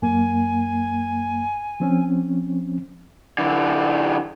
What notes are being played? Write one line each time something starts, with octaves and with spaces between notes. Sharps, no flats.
F#2 A#3 G#5
F3 C4 C#4
D3 E3